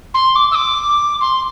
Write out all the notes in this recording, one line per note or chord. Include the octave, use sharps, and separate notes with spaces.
C6
D6
E6
D6
C6